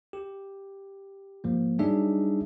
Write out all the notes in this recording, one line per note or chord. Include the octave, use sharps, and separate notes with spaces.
G4
G#2 F3 A#3
F#3 G3 D4 D#4 G#4 E5